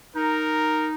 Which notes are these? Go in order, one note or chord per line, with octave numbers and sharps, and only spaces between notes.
D#4 A#4